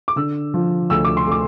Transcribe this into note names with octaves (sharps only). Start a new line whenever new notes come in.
D6
D3 E6
F3
D2 E6
D6
C6
A3 D6